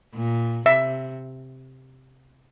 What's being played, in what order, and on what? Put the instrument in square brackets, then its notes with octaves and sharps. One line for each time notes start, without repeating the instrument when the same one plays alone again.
[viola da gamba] A#2
[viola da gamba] C3 [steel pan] E5